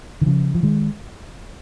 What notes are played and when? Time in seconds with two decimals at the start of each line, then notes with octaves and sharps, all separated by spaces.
0.21 D#3
0.26 C#3 F3
0.55 F3
0.63 D#3 G#3